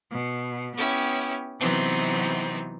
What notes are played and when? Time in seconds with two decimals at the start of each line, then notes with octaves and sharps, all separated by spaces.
0.11 B2
0.75 B3 C#4 E4 G4
1.61 C3 E3 F#3 B3 C4 D#4